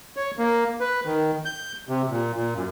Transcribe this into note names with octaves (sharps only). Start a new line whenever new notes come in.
C#5
A#3
B4
D#3
G6
C3
A#2
A#2
F#2